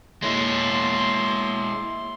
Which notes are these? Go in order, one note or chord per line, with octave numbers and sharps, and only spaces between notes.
G#3 A#3 E4 C#5 C6